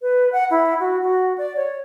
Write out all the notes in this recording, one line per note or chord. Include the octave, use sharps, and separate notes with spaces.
B4
F#5
E4
F#4
F#4
D5
C#5